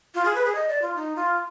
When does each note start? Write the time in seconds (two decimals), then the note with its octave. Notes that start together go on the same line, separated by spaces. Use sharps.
0.15 F4
0.25 G#4
0.35 B4
0.45 G#4
0.55 D#5
0.69 D5
0.82 F4
0.96 D#4
1.16 F4